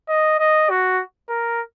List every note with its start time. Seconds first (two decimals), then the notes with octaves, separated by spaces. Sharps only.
0.09 D#5
0.40 D#5
0.70 F#4
1.29 A#4